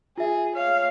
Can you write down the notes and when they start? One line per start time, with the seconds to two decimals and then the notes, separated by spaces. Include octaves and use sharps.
0.18 F4 G#4 E5
0.56 C#5 F5